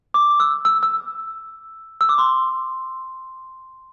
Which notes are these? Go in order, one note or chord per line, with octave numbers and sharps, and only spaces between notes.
D6
E6
E6
E6
E6
D6
C6